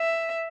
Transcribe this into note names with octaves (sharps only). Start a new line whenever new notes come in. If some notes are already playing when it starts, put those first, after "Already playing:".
Already playing: E5